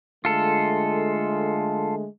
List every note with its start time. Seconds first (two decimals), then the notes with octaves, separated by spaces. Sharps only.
0.25 D3 G#3 A3 F4 A4